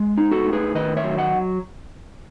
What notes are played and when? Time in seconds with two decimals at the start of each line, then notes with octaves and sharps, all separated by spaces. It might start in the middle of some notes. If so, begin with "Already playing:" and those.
Already playing: G#3
0.17 D#4
0.31 F#4 A4
0.47 A2
0.53 G#4 B4
0.75 D#3 B4 D#5
0.97 C#5 E5
1.04 F#3
1.18 D#5 F#5